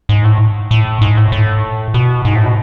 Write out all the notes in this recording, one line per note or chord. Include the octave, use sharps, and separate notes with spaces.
G#2
A2
A2
G#2
A2
A2
B2
G#2
A2
B2